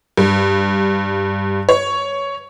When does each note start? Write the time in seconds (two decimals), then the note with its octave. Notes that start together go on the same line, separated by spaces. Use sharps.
0.17 G2
1.69 C#5